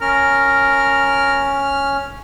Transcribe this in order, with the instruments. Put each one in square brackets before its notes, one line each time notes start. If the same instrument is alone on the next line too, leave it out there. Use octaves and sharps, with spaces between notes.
[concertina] C#4 F6 [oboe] A#4